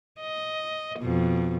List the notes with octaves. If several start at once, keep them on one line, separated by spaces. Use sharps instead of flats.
D#5
F2 B2